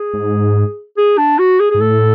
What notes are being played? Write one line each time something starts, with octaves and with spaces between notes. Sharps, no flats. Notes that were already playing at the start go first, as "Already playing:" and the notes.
Already playing: G#4
G#2
G#4
D4
F#4
G#4
G#2 G#4
A2 A4